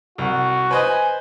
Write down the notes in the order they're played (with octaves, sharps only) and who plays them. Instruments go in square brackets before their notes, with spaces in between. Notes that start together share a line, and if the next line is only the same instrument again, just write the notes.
[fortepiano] C2 [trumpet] F#4
[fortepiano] B4 C5 D#5 [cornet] G#5